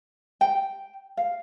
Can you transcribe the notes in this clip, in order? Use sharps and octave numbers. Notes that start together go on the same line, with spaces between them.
G5
F5